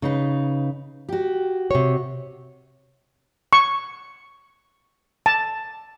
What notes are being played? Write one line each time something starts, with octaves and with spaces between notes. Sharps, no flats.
C#3 D#4 B4
F#4 G4
C3 C#5
C#6
A5